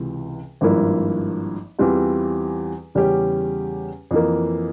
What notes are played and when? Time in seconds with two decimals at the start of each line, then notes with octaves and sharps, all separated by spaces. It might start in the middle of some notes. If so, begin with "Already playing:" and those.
Already playing: C#2 C3 E3
0.61 G#1 G2 F3 A#3 E4
1.79 E2 E3 G3 C4 F4
2.95 E2 C#3 G3 C#4 G4
4.11 F2 E3 A#3